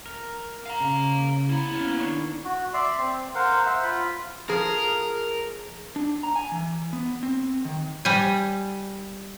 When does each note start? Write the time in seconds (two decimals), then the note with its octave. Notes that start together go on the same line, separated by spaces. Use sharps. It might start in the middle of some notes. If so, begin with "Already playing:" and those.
0.06 A#4
0.66 F5 A#5
0.80 C#3
1.49 A#3 B3 E4
1.75 C#4
2.00 D#3 D4 C#6
2.45 F#4
2.74 D5 E5 C6
2.98 C4
3.35 A#4 C5 F5 F#5
3.66 C5 E5 F#5
3.84 F4 B5
4.49 F3 G#4 A#4
5.96 D4
6.23 A#5
6.36 G#5
6.52 E3
6.93 B3
7.23 C4
7.65 D#3
8.05 G3 G#5